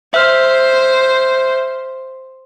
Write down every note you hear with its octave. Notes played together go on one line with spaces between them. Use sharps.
C5 E5 F6